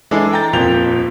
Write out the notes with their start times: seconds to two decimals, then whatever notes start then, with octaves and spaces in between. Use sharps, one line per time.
0.11 E3 G#3 D4 E4 G#4 A4
0.32 G5 A#5 G6 A6
0.53 D#1 F2 A#2 F4 G6 F7